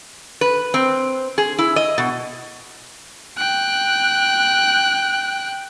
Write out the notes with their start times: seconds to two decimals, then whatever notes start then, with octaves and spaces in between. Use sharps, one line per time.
0.41 B4
0.74 C4
1.38 G#4
1.59 E4
1.76 D#5
1.98 B2
3.38 G5 F#6